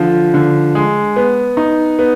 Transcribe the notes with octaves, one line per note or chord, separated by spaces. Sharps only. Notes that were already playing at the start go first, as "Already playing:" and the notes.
Already playing: D3 F3
D3
G#3
B3
D#4
B3